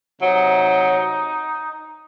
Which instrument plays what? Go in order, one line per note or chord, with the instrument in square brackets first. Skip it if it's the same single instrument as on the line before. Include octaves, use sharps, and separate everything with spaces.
[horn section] C3 F#3 D#4